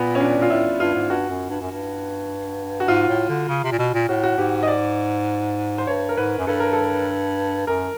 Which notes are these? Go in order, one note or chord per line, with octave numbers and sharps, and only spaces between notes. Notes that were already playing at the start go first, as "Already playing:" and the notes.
Already playing: A#2 B3
C#4
D4
A#2 F4
A2 E4
G2 F4
G#2
G2 F#4
F#2
G2
F#2
G2
F#4
G#2 F4
A2
D3
C#3
C3
A#2
B2
A#2
A2 F#4
F#4
G#2 G4
D#5
D5
C5
G2 C#5
A#4
G#2 B4
F#2
G2 A4
A#4
A4
F#2 A#4